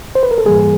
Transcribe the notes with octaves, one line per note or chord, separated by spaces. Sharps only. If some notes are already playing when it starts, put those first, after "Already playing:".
C5
B4
A#4
A4
G#2 E3 G3 A#3 G#4